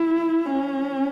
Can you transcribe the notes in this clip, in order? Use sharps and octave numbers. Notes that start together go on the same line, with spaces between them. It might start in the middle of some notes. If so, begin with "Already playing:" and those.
Already playing: E4
C#4